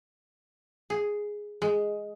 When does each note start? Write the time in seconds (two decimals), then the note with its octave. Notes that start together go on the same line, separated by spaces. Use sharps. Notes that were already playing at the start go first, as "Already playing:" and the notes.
0.90 G#4
1.62 G#3